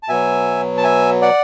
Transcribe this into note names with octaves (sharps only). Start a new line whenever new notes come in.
A5
B2 F#3 E5 G#5
A5
E5 G#5
D5 F#5